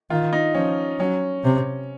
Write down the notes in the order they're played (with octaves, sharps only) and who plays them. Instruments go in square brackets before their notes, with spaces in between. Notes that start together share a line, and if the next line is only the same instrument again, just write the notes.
[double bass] D#3 [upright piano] F4
[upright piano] D#4
[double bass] F3 [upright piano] C#4
[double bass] F#3 [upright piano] C#4
[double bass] C3